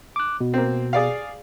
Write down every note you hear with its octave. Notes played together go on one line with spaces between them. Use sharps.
D6 F#6
B2
A#3 C4
G#4 D5 F5